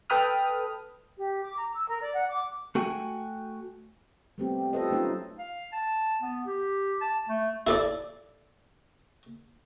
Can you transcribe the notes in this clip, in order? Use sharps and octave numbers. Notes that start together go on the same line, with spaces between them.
A4 B4 G5 B5 D#6 F6
G4
D6
A#5
E6
A#4
D5
F#5
D6
A3 F#4 G5 G#5
G3 A3 B3 C4 G4
F4 G4 A4 B4 C5 D#5
F#3 A3 C#4 D#4 F4 D#5
F5
A5
B3
G4
A5
A3
E4 A4 D5